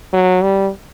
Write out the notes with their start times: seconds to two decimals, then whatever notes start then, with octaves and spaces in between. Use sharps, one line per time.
0.13 F#3
0.43 G3